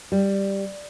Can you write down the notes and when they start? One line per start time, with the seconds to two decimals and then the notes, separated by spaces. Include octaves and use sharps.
0.12 G3